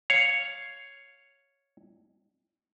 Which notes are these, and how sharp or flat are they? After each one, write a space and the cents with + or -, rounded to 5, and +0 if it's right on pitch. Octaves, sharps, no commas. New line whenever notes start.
C#5 +0 F5 +0